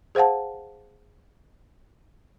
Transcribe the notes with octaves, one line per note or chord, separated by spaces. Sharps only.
G#4 C5 F5 F#5 A5